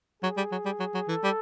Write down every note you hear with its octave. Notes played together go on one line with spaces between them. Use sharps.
F#3 G#4
G3
F#3
G3
F#3
F#3
E3 A4
G3